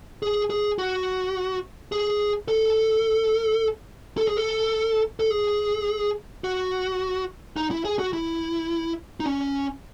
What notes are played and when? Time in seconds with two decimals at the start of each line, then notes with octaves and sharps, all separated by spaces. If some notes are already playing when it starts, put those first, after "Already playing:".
0.23 G#4
0.50 G#4
0.79 F#4
1.92 G#4
2.48 A4
4.17 A4
4.28 G#4
4.37 A4
5.20 A4
5.30 G#4
6.44 F#4
7.56 D#4
7.71 E4
7.85 G#4
7.99 F#4
8.13 E4
9.20 D#4
9.26 C#4